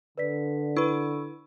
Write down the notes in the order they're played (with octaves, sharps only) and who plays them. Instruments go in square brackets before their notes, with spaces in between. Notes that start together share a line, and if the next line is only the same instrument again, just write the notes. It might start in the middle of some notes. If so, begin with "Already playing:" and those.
[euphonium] D3 [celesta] B4 D5 B6
[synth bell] E4 B4 [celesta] B5 C#6 E6